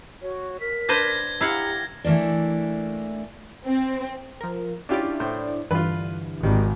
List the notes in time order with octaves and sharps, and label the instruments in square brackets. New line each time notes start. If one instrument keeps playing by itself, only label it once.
[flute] F#4 [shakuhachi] C#5
[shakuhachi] A#4 [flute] B6
[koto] D4 B4 C5 [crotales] G#6 A#6 G7
[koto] E4 F5 F#5 [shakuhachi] G4 [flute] A#5
[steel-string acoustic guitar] E3 A3 A#3 D4
[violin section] C4
[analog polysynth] F3 A#4
[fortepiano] C#4 F4 G4 [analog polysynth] D4 E4 D5
[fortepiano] A2 C5
[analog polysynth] G2 D3 E3 [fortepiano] F4 B4
[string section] G#1 [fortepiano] D#3 G3